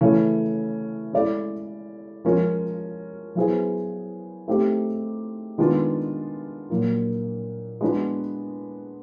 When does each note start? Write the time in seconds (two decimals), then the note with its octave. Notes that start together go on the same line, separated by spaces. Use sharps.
0.01 C#3 E3 A3 C#4 E4
1.13 G#3 C#4 E4 A4 D5
2.25 F3 G#3 C#4 F4 A#4
3.35 F#3 B3 E4 G#4 C5
4.48 A3 C4 D#4 G4 C5
5.58 D#3 G#3 B3 D4 F4
6.70 A#2 F#3 A#3
7.81 G#3 B3 D4 F#4 B4